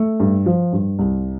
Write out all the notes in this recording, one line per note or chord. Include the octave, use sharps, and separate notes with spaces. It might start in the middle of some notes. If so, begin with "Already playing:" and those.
Already playing: A3
G2
F3
G2
C2